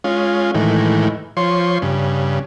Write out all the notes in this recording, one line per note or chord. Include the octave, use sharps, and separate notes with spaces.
G#3 C#4 F4
A2 D#3 E3 G#3
F3 C#5 C6
G2 C#3